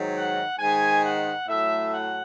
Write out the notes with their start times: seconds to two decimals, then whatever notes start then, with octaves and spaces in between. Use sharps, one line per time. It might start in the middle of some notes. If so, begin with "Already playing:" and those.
Already playing: G#2 D#3 F#3
0.15 F#5
0.59 G#2 D#3 G#3 G#5
1.03 F#5
1.47 A2 F#3 A3 E5
1.93 F#5